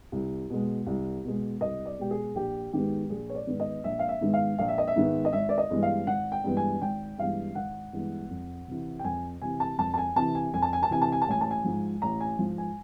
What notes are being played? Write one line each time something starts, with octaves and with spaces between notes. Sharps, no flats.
C2
B2 G#3
C2
B2 G#3
C2 D#5
D5
B2 G#3 G4
G#4
A#1 G4
G#2 D#3 G#3 B3 G4
A#1 G#4
C#5
D5
G#2 D#3 G#3 B3
D#5
A#1 E5
F5
E5
G#2 D#3 G#3 B3
F5
A#1 F5
E5
D#5
E5
G#2 D#3 G#3 B3
D#5
G#1 E5
D5
D#5
G2 E3 G#3 B3
F5
G#1 F#5
G5
G2 E3 G#3 B3
G#5
G#1 G5
G2 E3 G#3 B3 F5
G#1 F#5
G2 E3 G#3 B3
F2
C3 E3
G5
F2 G#5
C3 E3 G#5
A5
F2 A5
A5
G#5
C3 E3 A5
G#5
F2 G#5
A5
G#5
A5
C3 E3 G#5
A5
G#5
A5
A1 G#5
A5
G#5
G#2 F3
A1 A#5
G#5
G#2 F3
G#5